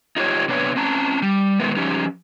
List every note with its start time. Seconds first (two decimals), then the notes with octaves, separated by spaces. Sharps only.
0.16 D#4 F4 G4 C#5
0.48 C3 B3 D4 B4 C#5
0.76 C4 C#4 A5 A#5
1.22 G3
1.60 B2 D#3 G#3 A3 B3
1.76 F3 C#4 D#4 G4